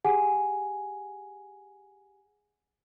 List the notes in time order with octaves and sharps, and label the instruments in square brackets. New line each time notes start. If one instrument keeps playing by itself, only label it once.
[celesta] G4 G#4 F#5 G#5